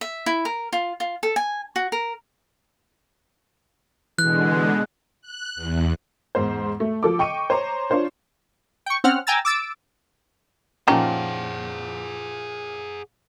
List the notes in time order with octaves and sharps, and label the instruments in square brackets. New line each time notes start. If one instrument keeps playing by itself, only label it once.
[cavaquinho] E5
E4
A#4
F4
F4
A4
G#5
F#4
A#4
[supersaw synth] B2 D3 G#3 [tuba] E3 [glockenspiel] F#6
[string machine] F#6
E2
[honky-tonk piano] E2 G#2 C5
A3
F3 A4 D6
D#5 G5 C#6 C#7 D#7
C5 C#5 A#5
D4 F4 C5 C#5
[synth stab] G5 C#6
C4 C#4 F#5 F6
G5 G#5 A#5 E6 A6
D6 E6 A6 D7
[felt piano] A#2 F3 [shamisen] C#4 D#4 G4 [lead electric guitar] G#4 F#5